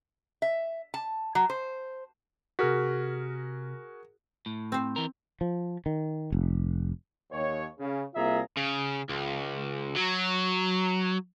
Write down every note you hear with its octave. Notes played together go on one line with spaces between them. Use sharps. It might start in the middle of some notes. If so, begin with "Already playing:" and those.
E5
A5
F#3
C5
C3 F#4 G#4 A#4 F6 B6
A2
C4 C5
E3 A#4
F3
D#3
F1
D#2 C#5
C#3
C2 A#3 F4 G#4 E5 A#5
C#3
C#2
F#3